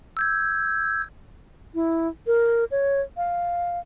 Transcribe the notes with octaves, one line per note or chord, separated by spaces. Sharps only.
E6 G6 G#6
E4
A#4
C#5
F5